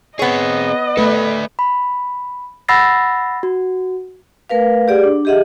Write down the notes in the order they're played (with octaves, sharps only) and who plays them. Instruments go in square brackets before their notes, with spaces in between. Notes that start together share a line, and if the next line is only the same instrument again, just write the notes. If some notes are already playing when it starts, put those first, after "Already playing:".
[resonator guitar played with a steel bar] B3 C#5 [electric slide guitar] C4 G#4 [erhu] D#5
[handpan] A3 B4 [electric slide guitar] A4 D5 E5
[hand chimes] B5
F#5 B5 E6 A6 A#6 C7
F#4
[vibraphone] A3 A#4 B4 F5
G4 G#4 D5 F#5
D4
G4 G#4 D#5 E5 F#5